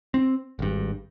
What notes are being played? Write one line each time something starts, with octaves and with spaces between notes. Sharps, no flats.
C4
G#1 G2